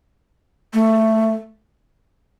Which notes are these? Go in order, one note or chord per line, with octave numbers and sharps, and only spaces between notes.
A3